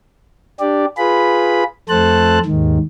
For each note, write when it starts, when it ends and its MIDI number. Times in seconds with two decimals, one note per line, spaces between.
0.60 0.85 62
0.60 0.85 67
0.60 0.85 74
0.98 1.64 65
0.98 1.64 68
0.98 1.64 71
0.98 1.64 83
1.89 2.39 41
1.89 2.39 57
1.89 2.39 69
1.89 2.39 72
1.89 2.39 81
1.89 2.39 90
2.46 2.78 39
2.46 2.78 44
2.46 2.78 51